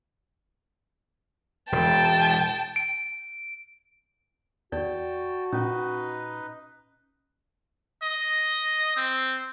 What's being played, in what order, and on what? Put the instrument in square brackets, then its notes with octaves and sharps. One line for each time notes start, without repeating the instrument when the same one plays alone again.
[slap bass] E1 [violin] G5 A5
[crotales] D7
[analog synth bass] E2 [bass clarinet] F#4 [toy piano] D5 [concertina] G5 A5
[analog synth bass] A#2 [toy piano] C#4 [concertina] D#4 B4 D#5
[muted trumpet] D#5
C4